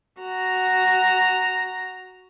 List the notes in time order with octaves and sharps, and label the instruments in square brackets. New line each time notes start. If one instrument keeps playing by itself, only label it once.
[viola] F#4 A#5